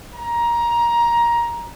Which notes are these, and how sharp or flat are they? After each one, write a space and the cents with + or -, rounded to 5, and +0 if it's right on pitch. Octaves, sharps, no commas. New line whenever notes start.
A#5 +15